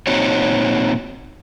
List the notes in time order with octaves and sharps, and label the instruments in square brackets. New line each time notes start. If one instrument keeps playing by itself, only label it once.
[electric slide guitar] A#2 C4 D#4 F#4 C#5